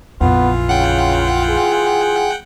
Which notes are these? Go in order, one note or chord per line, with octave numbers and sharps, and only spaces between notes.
A#1 F2 E3 B3 F4
C#3 F#5 G5
G#4